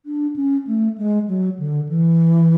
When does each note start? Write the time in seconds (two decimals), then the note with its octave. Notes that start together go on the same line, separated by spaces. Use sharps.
0.06 D4
0.36 C#4
0.67 A3
0.98 G#3
1.28 F#3
1.59 D3
1.89 E3